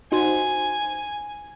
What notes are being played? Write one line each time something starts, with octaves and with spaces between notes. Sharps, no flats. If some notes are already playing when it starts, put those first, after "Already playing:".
D#4 F#4 C5 G#5